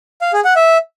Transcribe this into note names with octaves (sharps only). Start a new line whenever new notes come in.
F5
G#4
F#5
E5